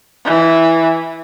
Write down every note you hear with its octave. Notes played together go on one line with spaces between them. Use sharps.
E3